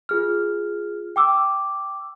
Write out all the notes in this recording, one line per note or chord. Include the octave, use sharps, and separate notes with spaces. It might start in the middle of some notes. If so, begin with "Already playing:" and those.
F4 G#4 F6
G5 D6 E6